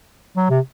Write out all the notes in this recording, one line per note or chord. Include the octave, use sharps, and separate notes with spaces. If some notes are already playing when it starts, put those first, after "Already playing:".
F#3
C3